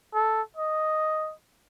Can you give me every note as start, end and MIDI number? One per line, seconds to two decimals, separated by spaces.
0.15 0.42 69
0.57 1.33 75